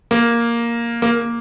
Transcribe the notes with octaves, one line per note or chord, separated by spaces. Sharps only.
A#3
A#3